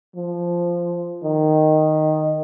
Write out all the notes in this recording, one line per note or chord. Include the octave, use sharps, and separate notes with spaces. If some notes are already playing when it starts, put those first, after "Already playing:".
F3
D#3